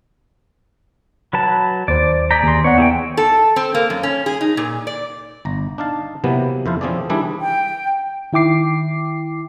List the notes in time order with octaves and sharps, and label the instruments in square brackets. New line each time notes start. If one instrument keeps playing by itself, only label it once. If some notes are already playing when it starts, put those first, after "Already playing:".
[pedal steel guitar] F#3 B4 A5
[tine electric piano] D#2 C5 [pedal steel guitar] D5
[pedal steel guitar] G#4 D5 A#5 [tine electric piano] G6 B6
[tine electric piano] D#2 C6
[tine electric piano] B3 D5 F#5 [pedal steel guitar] C#5
[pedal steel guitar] E3 G#4 G5
[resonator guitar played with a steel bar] A4
C4
A#3
F#2
C#4
G#4
D#4
A#2
D5
[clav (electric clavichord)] G1 A#5
D4 D#4 F5 A5
C3 E3 F#3 A#3 B3
F2 E4 C5 F5 A5
E3 F3 C4 C#4 G#4 D5
D#3 E3 G3 D4 E4 G#4
[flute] G5
[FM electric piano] D#3 E4 G5 D6 C7